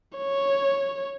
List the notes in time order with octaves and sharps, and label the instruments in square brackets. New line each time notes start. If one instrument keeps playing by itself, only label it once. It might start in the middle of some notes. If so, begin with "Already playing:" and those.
[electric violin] C#5